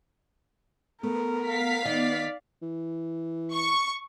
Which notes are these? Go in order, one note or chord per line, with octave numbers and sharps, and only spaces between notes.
A3 B3 A#4
F5 B6
D#3 D5 D#5
E3
C#6